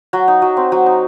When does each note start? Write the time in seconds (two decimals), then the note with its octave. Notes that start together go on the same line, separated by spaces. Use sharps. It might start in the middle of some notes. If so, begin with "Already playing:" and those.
0.13 F#3
0.28 D#4
0.42 F#3
0.57 C4
0.72 F#3
0.86 D#4